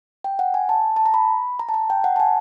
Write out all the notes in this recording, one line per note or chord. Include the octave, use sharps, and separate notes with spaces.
G5
F#5
G#5
A5
A5
A#5
B5
A#5
A5
A#5
G5
F#5
A5
G#5